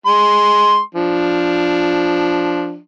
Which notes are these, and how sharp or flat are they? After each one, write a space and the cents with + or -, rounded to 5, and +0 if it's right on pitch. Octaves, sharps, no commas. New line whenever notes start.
G#3 +0 C6 +0
F3 +0 D4 +0